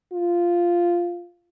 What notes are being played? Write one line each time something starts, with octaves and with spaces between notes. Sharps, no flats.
F4